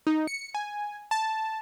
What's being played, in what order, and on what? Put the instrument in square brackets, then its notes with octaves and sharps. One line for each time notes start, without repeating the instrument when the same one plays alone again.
[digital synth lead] D#4
C#7
G#5
A5